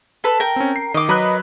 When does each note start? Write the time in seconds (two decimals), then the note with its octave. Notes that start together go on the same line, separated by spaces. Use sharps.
0.24 A4 B4
0.40 A#4 G5
0.56 C4 C#4
0.76 C7
0.94 D#3 D#5 D6
1.09 F#3 A#4 B4 D#5 B5 F#6